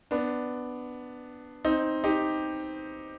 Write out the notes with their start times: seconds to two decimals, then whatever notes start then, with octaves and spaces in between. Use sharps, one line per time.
0.11 B3 D4
1.65 C4 D#4
2.04 D#4 G4